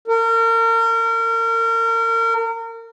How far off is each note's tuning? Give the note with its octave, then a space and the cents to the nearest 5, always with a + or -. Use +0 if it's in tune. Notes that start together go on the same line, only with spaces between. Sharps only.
A#4 -35